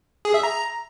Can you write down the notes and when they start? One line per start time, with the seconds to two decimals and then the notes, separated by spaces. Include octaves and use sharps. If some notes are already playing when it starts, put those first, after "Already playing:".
0.25 G#4
0.34 E5
0.43 A#5